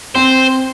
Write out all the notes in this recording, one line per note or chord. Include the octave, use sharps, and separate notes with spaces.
C4 C5